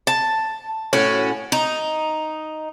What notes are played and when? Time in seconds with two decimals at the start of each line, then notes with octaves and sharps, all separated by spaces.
0.07 A5
0.93 A2 C#4 F#4
1.52 D#4